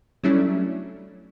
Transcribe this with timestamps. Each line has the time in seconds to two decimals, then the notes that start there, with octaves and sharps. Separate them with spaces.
0.24 F#3 G3 A3 C#4 D4 E4